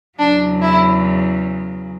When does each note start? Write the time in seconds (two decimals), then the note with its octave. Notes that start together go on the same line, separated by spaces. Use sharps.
0.18 E2 C#3 F#3 D4
0.61 E4